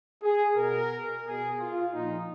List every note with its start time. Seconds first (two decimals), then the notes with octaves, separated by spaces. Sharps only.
0.23 G#4
0.57 B2 A#4
1.26 B2 G#4
1.60 F4
1.94 A#2 F3 D#4